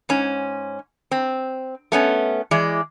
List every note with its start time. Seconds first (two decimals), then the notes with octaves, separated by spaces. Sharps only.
0.09 G#2 C#4
1.11 C4
1.92 A3 B3 C#4
2.51 E3 G#3 D5